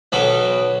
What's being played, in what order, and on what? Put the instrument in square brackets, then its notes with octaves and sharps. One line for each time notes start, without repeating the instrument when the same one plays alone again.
[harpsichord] B1 B2 F#3 A4 B4